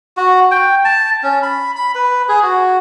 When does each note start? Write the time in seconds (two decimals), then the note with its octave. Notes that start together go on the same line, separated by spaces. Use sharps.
0.17 F#4
0.51 G5
0.85 A5
1.23 C#4
1.43 B5
1.76 B5
1.95 B4
2.29 G#4
2.43 F#4